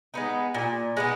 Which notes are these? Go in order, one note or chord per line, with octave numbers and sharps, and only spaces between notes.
G#3 B3 D#4
A#2
G#3 B3 D#4